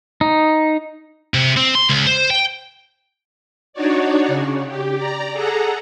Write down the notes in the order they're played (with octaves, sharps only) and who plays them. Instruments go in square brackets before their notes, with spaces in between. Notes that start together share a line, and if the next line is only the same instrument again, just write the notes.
[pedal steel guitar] D#4
[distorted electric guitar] C3
C4
C6
C#2
C5
G5
[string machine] D4 D#4 F#4 C#5 D5
C#3
G4
D5 A#5
G#4 A4 F#5 A#5